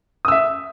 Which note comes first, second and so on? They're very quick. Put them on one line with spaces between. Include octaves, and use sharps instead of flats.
D#6 E6 E5